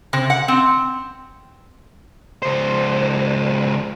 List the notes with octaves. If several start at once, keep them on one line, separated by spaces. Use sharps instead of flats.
C3
F#5
C4
C#2 C5